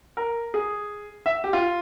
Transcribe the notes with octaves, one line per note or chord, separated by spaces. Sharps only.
A#4
G#4
E5
G4
F4